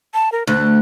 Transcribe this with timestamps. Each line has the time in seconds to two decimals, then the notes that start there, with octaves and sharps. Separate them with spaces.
0.14 A5
0.32 A#4
0.47 D2 F#6